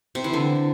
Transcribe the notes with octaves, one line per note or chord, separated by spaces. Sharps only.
C3
E3
D3